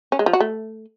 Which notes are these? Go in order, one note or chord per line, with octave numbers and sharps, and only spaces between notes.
C#4
G#3
F3
F#4
A3